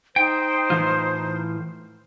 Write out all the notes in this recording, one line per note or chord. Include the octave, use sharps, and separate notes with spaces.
D#4 C5 G5
A2 E3 F4